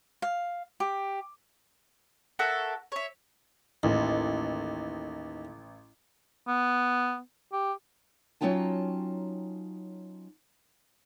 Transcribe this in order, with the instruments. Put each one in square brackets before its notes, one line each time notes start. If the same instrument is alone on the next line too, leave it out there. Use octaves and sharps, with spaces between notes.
[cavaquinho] F5
G4
[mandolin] F#4 A4 A#4 E5
C#5 E5
[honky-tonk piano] A1 [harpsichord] D#2
[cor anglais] B3
G4
[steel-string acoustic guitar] F#3 C#4 D#4 F4 G5 A5